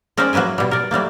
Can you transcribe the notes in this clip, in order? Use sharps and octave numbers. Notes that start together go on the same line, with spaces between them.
G#3 C#4 A#4 C5 D5 G5
F#3 A#3 B4 E5 G#5
B2 G3
A#4 D5
F#3 G3 A3 A#3